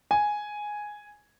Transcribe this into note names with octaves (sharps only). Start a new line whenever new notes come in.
G#5